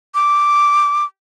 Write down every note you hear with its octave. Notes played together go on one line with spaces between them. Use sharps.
D6